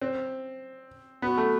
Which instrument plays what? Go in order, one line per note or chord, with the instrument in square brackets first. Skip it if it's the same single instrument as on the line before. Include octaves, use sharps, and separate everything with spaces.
[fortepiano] C4
[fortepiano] B3 [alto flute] F#4
[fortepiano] A3